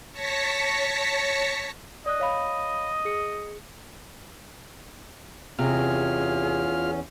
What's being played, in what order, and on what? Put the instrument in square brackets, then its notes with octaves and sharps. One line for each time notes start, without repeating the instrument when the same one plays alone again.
[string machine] C#5 A5 A#6 B6 C#7
[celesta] D5 D#6 F#6 [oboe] D#5
[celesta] C#5 F5 B5
G#4 C#7
[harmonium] E2 C#4 [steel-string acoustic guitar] C3 [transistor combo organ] F4 F6 [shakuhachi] G#4